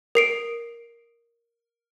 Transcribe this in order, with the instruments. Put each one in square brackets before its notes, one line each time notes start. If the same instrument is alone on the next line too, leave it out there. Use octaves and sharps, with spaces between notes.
[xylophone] A#4 C7 D7